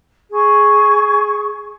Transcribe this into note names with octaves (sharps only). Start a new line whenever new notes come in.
G#4 C#6